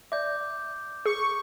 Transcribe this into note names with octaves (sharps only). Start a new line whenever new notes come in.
D5 E5 D6 G6
G#4 C#6